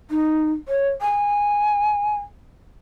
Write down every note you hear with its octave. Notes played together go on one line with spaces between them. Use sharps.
D#4
C#5
G#5